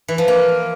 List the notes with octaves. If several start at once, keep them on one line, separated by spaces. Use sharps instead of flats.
E3
F3
A#3